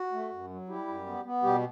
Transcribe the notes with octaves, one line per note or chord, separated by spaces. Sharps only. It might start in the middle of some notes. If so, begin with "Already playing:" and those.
Already playing: F#4
A3
F#2
F#3
G3 E4 G4
F#2
B3
B3
B2 G3 G4